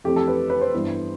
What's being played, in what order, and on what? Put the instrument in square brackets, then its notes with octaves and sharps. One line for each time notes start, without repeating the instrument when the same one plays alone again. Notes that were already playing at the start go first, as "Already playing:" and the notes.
[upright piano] F2 E3 A3 C4 G4
A4
B4
B4
C5
G2 E3 B3